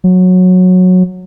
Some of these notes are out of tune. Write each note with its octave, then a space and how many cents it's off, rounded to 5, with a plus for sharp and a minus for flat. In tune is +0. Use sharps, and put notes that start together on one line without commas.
F#3 -15